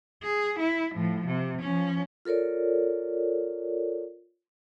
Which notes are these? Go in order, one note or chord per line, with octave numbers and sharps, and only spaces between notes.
G#4
E4
A2 F3
C3
F3 C#4
F4 A4 A#4 C#5 D5